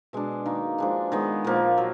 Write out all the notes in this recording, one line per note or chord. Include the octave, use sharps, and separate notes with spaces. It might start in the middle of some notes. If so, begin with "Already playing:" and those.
B2 G#3 D4
D#3 A#3 D#4
F3 G#3 D4
D#3 G#3 B3
A#2 F3 A#3
F#3